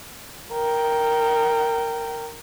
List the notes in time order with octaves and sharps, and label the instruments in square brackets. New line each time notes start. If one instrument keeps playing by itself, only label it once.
[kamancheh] A#4 G5